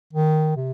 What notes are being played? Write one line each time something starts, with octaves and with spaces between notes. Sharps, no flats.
D#3
C3